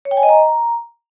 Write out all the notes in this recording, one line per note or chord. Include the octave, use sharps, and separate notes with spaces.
C#5
G5
G#5
D#5
A#5